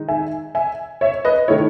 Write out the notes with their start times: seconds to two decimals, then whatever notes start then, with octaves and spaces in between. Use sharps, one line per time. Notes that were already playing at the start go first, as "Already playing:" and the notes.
Already playing: D#3 G#3 D#4
0.08 E5 G#5
0.55 E5 G#5
1.01 C#5 E5
1.25 B4 D#5
1.48 D#3 A3 E4 C#5